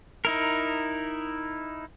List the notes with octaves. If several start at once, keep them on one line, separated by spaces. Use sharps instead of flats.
D#4 E4 A#4